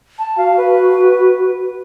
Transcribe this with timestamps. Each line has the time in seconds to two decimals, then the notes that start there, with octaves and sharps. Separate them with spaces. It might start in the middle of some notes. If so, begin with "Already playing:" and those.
0.19 A5
0.37 F#4 F5
0.57 B4